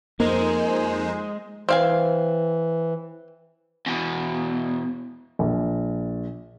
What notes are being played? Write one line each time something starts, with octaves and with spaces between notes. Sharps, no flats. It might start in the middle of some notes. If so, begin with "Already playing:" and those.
F2 G#3 A#3 D#4 A#4 C5
E3 C4 F5 G#5
E2 B2
A#1